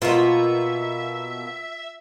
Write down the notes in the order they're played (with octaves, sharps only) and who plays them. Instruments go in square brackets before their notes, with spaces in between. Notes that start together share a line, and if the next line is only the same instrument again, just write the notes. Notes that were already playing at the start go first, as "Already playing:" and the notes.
[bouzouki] B2 A#3 B3 [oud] F4 [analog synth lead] E5